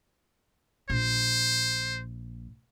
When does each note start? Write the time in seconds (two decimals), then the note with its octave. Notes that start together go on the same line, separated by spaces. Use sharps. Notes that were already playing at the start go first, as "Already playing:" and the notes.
0.90 A#1 A#2 C5